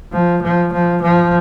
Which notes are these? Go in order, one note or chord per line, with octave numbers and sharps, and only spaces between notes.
F3
F3
F3
F3